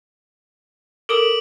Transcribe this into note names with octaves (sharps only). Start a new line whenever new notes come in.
A4 A#4 D6 D#6 D7 F#7